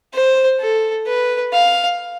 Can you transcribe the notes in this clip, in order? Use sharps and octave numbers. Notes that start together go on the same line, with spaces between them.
C5
A4
B4
F5